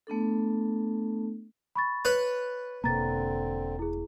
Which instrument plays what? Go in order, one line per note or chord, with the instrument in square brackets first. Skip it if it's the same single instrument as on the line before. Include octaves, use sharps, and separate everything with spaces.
[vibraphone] A3 B3 D4 A4
[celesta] B5 C#6 A6
[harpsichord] B4 C#5
[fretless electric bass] E1 B2 A#3 [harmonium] D3 C4 [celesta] A#5 A6
[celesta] E4 G#4